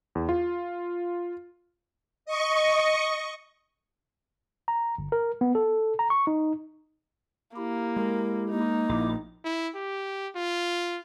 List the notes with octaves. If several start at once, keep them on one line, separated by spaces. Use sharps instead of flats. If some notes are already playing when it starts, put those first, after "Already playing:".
E2
F4
D#5 C#6
A#5
G1
A#4
B3
A4
A#5
C#6
D#4
A#3 E4 G4
G#3 A#4
A#3 D#4
A#1 E4 D6
E4
G4
F4